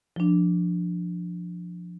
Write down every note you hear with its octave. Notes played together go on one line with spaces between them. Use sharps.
F3 D4